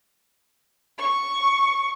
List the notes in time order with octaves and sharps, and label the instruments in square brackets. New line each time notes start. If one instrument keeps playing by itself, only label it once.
[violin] C#6